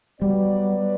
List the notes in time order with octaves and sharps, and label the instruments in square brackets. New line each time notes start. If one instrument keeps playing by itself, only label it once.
[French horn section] F#3 B3 F#4 B4 D5 [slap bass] G3